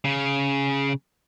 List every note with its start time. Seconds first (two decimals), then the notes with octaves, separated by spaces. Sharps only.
0.05 C#3